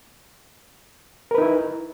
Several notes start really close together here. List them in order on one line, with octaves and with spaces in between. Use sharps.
A#4 B4 D#4 E4